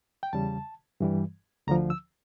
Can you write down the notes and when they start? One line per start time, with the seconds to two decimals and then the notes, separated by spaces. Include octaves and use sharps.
0.23 G5
0.33 E2 C#3 G3 A5
1.00 G2 E3 G3
1.67 D2 D3 F3 A#5
1.90 E6